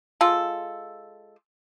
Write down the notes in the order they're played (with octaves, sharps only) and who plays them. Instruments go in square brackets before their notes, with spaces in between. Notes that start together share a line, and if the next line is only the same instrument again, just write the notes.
[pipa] G#3 F4 A4